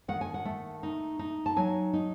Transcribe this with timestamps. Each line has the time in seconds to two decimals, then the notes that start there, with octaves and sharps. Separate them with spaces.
0.08 D#3 F#5
0.21 G#5
0.34 F#5
0.45 A3
0.83 D#4
1.19 D#4
1.46 A5
1.56 F#3 G#5
1.93 D#4